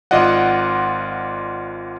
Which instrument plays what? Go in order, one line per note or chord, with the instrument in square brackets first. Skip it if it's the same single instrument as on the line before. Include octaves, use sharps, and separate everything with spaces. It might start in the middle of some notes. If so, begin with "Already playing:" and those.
[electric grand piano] G#1 F4 D5 D#5 F#5